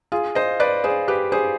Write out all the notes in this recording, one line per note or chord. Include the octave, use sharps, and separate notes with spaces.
F4 G#4
C5 D#5
B4 D5
G#4 C5
G4 B4
G#4 C5